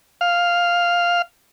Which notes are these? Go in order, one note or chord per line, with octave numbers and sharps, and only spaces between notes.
F5